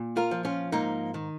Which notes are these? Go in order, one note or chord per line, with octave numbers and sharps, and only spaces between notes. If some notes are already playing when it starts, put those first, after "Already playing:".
Already playing: A#2
F4 A#4
F3
C#4 F4
G#2 A#3 D#4
D#3